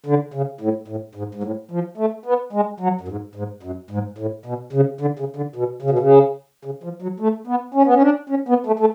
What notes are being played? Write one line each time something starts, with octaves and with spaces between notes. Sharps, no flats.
D3
C#3
A2
A2
G#2
G#2
A2
F3
A3
B3
G#3
F#3
F#2
G#2
G#2
F#2
G#2
A2
B2
C#3
D3
C#3
D3
B2
C#3
B2
C#3
C#3
F3
F#3
A3
B3
C#4
B3
C#4
D4
C#4
B3
A3
A3